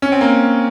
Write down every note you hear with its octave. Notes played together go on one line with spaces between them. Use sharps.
C#4
C4
A#3